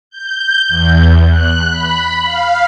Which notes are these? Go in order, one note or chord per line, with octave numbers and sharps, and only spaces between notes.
G6
E2
F#6
B5
F5